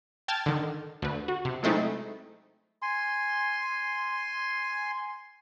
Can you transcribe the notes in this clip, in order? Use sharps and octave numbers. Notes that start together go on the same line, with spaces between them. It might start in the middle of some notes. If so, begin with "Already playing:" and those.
G5 A5 F6 G#6 A6
D3 D#3
D2 B4
F#4
C3
F#3 G#3 A3 C4 D#4 E4
G#5 C6